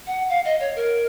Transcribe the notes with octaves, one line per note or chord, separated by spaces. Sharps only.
F#5
F5
D#5
C#5
A#4